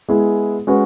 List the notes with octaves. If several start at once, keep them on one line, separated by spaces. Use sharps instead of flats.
G#3 B3 E4 G#4
G#3 C#4 F#4 B4